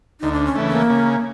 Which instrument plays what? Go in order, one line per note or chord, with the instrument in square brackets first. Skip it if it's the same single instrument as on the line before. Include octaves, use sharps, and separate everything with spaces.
[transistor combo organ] D2 [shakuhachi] D#4
[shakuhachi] D4
C#4
[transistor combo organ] C#3 E3 A3
[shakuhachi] A#3
[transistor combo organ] C#3